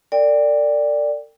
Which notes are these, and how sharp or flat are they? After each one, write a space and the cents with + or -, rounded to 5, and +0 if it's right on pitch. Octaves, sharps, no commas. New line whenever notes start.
A#4 -45 D5 +0 G5 +20